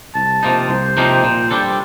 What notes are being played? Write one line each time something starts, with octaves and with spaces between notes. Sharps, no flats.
C2 A5
C3 F3 A#3 D#4
C2 C5
C3 F3 A#3 D#4
A#2
G3 D4 A4